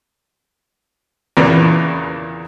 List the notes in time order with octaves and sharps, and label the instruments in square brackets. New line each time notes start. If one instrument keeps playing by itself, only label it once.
[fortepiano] E2 A#2 C#3 E3